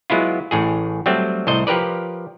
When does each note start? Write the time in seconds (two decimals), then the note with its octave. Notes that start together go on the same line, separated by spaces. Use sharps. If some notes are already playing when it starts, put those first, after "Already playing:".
0.10 F#3 G#3 B3 E4 F4
0.51 A1 A2 G#4
1.06 F#3 G3 A3 C4
1.47 C2 A2 C5 D#5
1.67 F3 G4 A#4 B4 D5